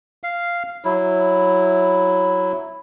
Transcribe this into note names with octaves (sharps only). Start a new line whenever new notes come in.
F5
F#3 E4